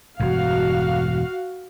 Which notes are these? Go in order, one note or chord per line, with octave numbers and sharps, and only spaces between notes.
E1 G2 F#4 F5